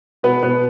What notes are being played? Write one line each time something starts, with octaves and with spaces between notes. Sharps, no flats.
B2 B3 B4
B2 B3 B4